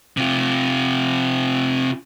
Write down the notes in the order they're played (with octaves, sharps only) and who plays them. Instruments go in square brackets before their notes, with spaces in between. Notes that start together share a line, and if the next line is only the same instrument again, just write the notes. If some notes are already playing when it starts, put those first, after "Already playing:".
[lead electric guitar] C3 F4